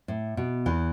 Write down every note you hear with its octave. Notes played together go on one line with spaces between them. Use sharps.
A2
B2
E2 E3